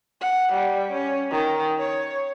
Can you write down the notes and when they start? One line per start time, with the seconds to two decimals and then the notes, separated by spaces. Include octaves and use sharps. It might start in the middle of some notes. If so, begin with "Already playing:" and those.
0.21 F#5
0.53 G3
0.92 C#4
1.31 D#3
1.79 C#5